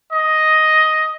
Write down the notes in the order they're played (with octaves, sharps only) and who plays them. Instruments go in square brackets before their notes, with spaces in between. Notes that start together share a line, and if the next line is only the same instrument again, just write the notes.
[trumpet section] D#5